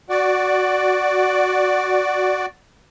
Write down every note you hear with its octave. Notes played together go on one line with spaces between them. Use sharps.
F#4 D5